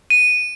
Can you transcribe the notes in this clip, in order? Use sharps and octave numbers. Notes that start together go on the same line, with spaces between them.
D#7